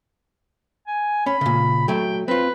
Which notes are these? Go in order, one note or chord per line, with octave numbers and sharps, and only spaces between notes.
G#5
C#4 B5
A#2 C#3
F#3 A3 G5
C4 F4 B4